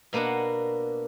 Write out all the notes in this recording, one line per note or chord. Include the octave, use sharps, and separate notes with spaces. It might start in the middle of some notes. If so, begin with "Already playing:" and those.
B2 A#3 B3 D4 F#5